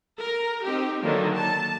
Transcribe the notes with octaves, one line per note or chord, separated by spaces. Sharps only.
A#4
C4 D#4 G4
D3 D#3 F#3 A#3 D4
A5